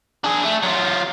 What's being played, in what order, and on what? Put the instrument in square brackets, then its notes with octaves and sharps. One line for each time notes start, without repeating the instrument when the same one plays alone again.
[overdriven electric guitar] D4 G#4
A3
F#3 F4